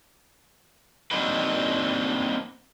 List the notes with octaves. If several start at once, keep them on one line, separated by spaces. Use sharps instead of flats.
A#3 C4 D4 D#4 F#4 B4